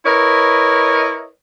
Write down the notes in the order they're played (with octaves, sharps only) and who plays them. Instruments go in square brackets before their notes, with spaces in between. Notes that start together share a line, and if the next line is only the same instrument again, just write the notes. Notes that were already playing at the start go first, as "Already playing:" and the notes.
[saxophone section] E4 A#4 B4 C#5 D#5